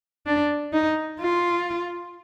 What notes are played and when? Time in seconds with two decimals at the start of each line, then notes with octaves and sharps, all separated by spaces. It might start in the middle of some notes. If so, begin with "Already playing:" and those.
0.26 D4
0.73 D#4
1.20 F4